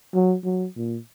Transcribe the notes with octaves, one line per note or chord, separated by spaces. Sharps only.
F#3
F#3
A#2